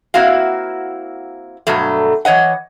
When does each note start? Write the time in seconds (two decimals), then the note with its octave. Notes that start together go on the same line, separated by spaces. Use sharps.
0.14 A#3 C4 E4 F#4 F5
1.67 G2 B2 F#3 A3
2.25 E3 C#5 D#5 F#5